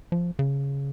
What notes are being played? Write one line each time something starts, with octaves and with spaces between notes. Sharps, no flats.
F3
C#3